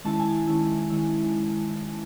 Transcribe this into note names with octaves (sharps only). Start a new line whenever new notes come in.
D#3 G#3 C#4 E4 A5
G#5
A5
D#3 G#3 C#4 E4
D#3 G#3 C#4 E4